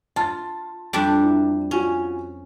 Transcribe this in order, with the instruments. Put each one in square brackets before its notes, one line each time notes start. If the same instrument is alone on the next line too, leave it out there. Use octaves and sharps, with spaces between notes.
[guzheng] F4 [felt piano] A5 A6
[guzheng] F2 G3 D4
[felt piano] E4
[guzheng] C#4 [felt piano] F4 F#4 G#5